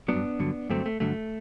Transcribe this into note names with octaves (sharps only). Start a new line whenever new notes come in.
G2 F#3 B3 D4
G2 D3 F#3
G2 D3 F#3 A3 C4
A3
G2 D3 F#3 A3